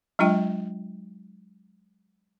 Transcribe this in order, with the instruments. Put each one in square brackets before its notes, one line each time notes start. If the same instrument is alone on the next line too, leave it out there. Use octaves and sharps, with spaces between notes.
[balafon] F#3 G#3 D4 F4 G5